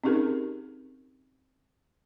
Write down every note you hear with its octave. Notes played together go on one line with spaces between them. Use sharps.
C4 C#4 D#4 G4 G#4 A#4